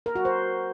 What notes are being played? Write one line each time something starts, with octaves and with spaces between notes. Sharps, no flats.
A#4
F#4
C5